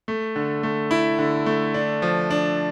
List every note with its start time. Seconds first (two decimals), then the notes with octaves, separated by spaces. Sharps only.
0.08 A3
0.36 D3
0.63 A3
0.91 E4
1.19 D3
1.46 A3
1.74 D4
2.02 F3
2.30 D4